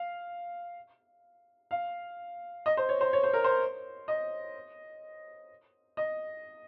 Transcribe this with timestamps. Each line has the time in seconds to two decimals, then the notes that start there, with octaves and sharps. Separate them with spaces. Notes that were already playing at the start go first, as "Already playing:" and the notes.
Already playing: F5
1.71 F5
2.66 D#5
2.77 C5
2.89 C#5
3.01 C5
3.13 C#5
3.23 C5
3.34 A#4
3.44 C5
4.08 D#5
5.97 D#5